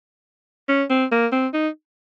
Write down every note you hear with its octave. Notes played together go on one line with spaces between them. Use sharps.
C#4
C4
A#3
C4
D#4